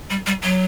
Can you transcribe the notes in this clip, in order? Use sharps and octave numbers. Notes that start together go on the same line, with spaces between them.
G3
G3
F#3